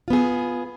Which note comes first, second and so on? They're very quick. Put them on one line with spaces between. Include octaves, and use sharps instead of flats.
F4 B3 G#4